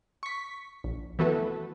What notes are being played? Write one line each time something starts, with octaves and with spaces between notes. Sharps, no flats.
C#6 B6
A#1
E3 A3 B3 F#4 A4 B4